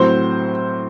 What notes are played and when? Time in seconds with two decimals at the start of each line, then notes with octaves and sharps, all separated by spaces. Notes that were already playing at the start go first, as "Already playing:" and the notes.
Already playing: A2 F#3 C4 C5